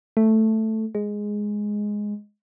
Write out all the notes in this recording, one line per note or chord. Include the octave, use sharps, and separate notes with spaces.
A3
G#3